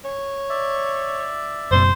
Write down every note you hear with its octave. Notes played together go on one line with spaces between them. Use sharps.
C#5
D5 E5
F#1 F#2 B2 C5